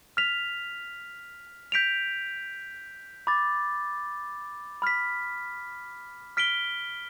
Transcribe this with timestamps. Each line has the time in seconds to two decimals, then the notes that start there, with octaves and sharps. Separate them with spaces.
0.17 F6 B6 F7
1.72 G6 B6 D7 F7
3.27 B5 D6 A6
4.82 B5 F6 B6
6.37 F6 B6 D7 G7